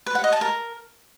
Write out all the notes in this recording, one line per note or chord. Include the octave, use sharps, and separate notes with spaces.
B4
F#5
D#5
A5
A#4